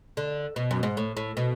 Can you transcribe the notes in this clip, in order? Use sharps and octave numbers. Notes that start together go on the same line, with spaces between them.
D3
B2
F#2
G#2
A2
A2
B2